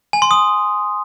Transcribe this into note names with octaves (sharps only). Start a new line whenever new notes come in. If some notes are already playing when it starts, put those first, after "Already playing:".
G#5
C6
D#6